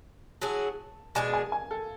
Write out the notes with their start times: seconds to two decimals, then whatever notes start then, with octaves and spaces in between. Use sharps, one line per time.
0.42 F#3 C#4 E4 G#4 A5
1.15 B2 G#3 D4 G#4 G#5
1.34 G#5
1.52 G#5
1.71 A4